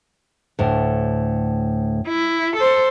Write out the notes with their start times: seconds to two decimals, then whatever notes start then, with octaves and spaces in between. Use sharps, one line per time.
0.59 D2 A2
2.08 E4
2.56 A4 C5